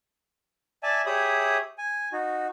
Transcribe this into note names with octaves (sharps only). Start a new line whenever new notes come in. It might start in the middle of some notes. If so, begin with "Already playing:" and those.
D5 E5 G#5 A5
G4 G#4 C#5 E5 B5 D#6
G#5
D#4 F#4